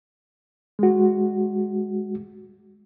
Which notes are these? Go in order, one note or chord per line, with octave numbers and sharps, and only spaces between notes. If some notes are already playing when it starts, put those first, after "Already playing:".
G#3 F#4